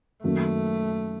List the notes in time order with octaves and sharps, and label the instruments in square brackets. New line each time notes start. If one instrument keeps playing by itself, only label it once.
[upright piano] F#2 D#3 F#3 A#3 [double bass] A3